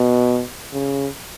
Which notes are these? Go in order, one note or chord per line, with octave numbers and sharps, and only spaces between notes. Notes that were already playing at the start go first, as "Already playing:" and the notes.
Already playing: B2
C#3